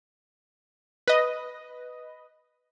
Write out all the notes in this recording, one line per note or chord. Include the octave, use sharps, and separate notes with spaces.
B4 D#5